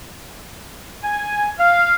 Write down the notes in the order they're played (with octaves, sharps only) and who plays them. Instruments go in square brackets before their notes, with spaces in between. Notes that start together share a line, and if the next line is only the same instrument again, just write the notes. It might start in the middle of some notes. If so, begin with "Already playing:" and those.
[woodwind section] G#5
F5